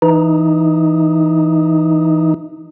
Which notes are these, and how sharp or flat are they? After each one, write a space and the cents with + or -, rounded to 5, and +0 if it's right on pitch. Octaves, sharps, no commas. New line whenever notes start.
E3 +0 D#4 +0